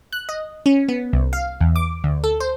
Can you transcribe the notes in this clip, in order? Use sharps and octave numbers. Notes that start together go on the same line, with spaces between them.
F#6
D#5
C#4
B3
C2
F5
E2
D6
D2
A4
C5